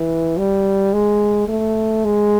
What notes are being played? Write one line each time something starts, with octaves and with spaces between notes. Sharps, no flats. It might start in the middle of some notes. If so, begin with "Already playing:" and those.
Already playing: E3
G3
G#3
A3
G#3